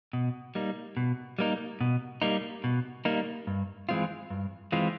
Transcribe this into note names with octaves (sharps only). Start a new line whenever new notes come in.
B2
G3 A#3 D#4
B2
G3 A#3 D#4
B2
G3 A#3 D#4
B2
G3 A#3 D#4
G2
E3 G#3 C4 F4
G2
E3 G#3 C4 F4